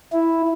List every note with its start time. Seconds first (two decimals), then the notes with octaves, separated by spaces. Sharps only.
0.12 E4